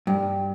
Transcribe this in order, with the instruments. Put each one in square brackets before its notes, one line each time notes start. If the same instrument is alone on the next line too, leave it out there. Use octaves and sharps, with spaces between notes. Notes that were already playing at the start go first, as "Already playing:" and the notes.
[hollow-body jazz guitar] G2